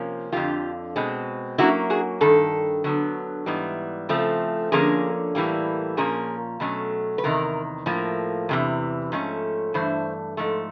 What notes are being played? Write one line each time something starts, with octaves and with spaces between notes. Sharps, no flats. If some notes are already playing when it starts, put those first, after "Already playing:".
Already playing: C3 F3 A#3 C#4
F2 D3 F3 F4 G4
B2 G#3 C4
D3 F#3 A#3 C#4 E4 F#4
F#4 G#4
G2 D#3 A4
D3 F#3 B3
G#2 E3 G3 B3
C#3 F3 A3 C4
D3 F3 A#3 C#4 G#4 A#4
A2 E3 G3 A#3
A#2 F3 A#3 C#4 G#4 A#4
B2 F#3 A3 C#4
B4
E2 C3 D#3 A#4
A2 F3 A#3
E2 C3 E3
G#2 F3 A3 C#4
G2 E3 A3 C5
G#2 F3 A3